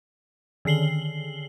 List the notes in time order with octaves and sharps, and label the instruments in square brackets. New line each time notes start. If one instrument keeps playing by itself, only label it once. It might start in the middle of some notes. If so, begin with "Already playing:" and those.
[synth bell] D3 D#3 C7 F#7 G7